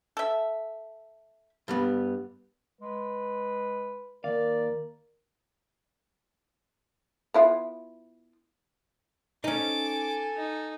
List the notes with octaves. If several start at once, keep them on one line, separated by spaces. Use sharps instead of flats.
A4 E5
G2 G3 B3
G#3 B4
D#2 A#4 D5 F5
B3 E4 F4
C#4 D#4 A4 G#5 D6
D#4